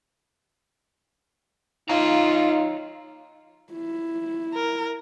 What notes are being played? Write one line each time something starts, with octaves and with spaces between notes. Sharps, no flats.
D#4 F4 C#5 F5 A#5
E4
A#4